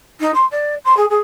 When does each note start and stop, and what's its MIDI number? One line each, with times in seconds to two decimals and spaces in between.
0.20 0.31 63
0.34 0.45 84
0.51 0.75 74
0.84 0.96 84
0.97 1.05 68
1.10 1.18 68